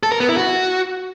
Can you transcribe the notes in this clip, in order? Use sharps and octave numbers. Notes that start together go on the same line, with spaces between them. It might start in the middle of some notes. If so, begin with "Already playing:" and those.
A4
A#4
B3
E4
F#4